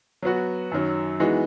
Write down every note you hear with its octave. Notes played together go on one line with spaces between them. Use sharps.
F#3 B3 F#4
F#2 D#3 F#3
E3 G#3 B3 D#4 F#4